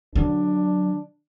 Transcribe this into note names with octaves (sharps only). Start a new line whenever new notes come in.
D3 F#3 D4